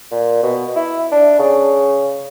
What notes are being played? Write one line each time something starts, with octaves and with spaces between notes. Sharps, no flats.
A#2
B2
E4
D4
C#3